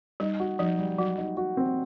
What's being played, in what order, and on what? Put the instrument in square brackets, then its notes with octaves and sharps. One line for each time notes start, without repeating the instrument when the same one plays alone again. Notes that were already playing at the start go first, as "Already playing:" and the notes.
[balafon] G3 [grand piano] D#4
[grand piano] F#4
[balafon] F3 [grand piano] D#4
[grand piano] G3
[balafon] F#3 [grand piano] F#4
[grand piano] D#4
F#4
C4